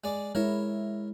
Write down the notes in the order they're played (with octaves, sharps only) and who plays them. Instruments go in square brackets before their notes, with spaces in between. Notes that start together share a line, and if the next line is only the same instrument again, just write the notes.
[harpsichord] G#3 D5
[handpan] G#3 E4 [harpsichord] A#4 C#5 E5